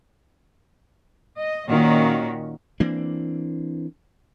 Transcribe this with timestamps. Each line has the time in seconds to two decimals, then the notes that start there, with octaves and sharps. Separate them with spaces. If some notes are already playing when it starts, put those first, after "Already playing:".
1.38 D#5
1.69 A#2 D#3 C#4 F#4
2.80 E3 A#3 C4 D4